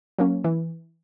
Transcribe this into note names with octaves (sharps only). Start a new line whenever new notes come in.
F#3 A#3 C#4
E3